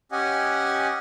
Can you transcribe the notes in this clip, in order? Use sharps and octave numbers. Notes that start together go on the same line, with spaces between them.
C#4 G4 D#5 F#5 G#5